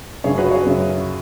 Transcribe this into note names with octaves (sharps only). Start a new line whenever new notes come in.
F#2 C#3 F#3 G#4 C#5
F#4 B4
G#4 C#5
F#2 C#3 F#3